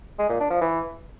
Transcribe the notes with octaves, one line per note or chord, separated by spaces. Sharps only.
G#3
A#2
D4
F3
E3